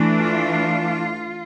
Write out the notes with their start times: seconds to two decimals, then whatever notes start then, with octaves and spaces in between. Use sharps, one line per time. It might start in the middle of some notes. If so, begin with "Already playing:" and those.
Already playing: E3 A3 D4
0.19 F4